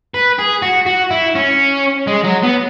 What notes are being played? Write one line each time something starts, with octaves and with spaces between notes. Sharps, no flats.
B4
G#4
F#4
F#4
E4
C#4
G#3
F#3
B3